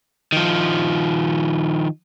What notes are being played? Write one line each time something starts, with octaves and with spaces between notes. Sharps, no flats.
D#3 F3